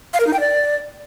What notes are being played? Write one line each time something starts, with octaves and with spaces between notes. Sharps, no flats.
F5
A#4
D#4
G5
D5